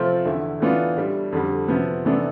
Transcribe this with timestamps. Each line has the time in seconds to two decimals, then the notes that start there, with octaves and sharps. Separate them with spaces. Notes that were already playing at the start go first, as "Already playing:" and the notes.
Already playing: C3 F3 A3 C4 F4
0.25 E2 D3 A3 E4
0.60 A2 E3 B3 D4 F4
0.97 A2 G3 D4
1.32 F2 D3 G3
1.68 C3 F3 B3
2.05 C3 E3 B3 D4 A4